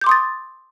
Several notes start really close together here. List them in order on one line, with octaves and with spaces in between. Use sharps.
G6 D6 C6 D#6 A6